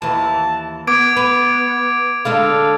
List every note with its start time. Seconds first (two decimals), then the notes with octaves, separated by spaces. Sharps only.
0.02 D#2 E3 A5
0.87 B3 D6 G#6 D7
1.16 B4
2.25 D3 G#3 D4 F5